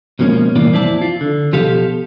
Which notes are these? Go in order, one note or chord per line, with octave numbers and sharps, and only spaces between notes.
G#2 B2 F3 A#3 C#4
C2 A#2 E3 A#3 F4 D5
F2 C4 E4 D5 A5
F4
D3
B2 F3 G4 A4 F5